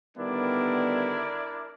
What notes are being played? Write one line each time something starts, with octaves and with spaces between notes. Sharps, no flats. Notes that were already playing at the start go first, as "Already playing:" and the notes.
D3 D#3 G3 B3 D4 E4 A#4 D5